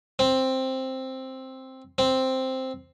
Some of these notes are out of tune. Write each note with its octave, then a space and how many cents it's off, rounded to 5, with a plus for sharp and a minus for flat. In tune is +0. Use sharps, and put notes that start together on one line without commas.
C4 +5
C4 +0